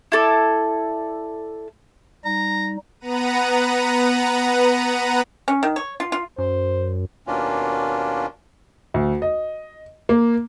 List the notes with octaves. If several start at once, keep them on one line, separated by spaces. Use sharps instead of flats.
E4 A4 D5
G3 D#4 A#5
B3 B4 F#5 A#5 D#7
C#4
D#3
C#5
F4
F4
F#2 C5
D#2 B2 A#3 C#4 D4 F4
D2
D#5
A#3